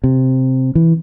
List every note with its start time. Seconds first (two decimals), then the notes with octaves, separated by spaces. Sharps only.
0.04 C3
0.75 E3